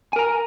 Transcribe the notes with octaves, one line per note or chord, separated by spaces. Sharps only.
A#4 G#5 A#5